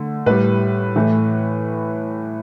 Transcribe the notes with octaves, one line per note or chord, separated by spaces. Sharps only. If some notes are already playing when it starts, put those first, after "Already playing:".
Already playing: D3 A3
A2 G3 B4
A2 E3 A3